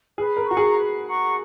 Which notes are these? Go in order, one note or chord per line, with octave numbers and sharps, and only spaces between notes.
G#4 B4
A#4
F#4 F#5 A#5 C#6
G#4
B4
F#5 A#5 C#6